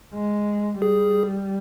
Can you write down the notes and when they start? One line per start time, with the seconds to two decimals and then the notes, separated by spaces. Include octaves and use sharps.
0.14 G#3
0.82 G3 G#4